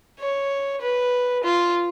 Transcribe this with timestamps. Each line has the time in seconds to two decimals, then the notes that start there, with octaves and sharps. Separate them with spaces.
0.20 C#5
0.82 B4
1.44 F4